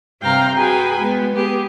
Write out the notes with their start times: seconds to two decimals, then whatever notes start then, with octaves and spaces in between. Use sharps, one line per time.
0.21 G2 C3 F5 G5 A#5 F6
0.56 F#4 G#4 B4 G5 G#5
1.00 G#3 B3
1.34 B3 G4 G#4